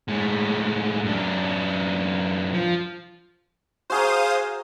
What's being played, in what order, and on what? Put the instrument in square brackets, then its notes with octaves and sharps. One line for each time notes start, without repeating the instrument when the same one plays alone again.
[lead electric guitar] A2 G#3
F#2 D4
F3
[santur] F#4 G#4 A#5 [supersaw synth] C5 F5 D#6